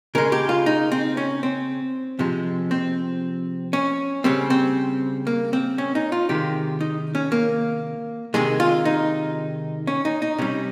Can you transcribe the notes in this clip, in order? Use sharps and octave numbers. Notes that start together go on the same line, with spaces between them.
C#3 G#3 A#4
G4
F4
D#4
C4
C#4
C4
C3 F3 G#3
C4
C#4
C#3 G3 C4
C4
A#3
C4
C#4
D#4
F4
C3 D#3 G#3 G4
D#4
C#4
A#3
C3 D#3 G#3 G#4
F4
D#4
C#4
D#4
D#4
C3 G3 C#4